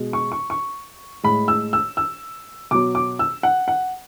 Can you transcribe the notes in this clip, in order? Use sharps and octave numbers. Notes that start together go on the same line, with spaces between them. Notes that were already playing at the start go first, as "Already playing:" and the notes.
Already playing: B2 G#3
C#6
C#6
C#6
A2 G#3 B5
E6
E6
E6
B2 F#3 D6
D6
E6
F#5
F#5